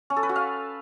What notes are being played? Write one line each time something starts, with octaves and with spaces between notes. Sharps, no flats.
C#4
A4
B4
F#4
F5